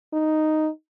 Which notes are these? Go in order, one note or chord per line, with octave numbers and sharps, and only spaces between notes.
D#4